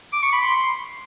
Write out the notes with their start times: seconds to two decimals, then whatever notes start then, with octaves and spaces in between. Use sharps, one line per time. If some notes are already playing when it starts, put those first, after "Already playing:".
0.13 D6
0.23 C#6
0.32 B5
0.42 C6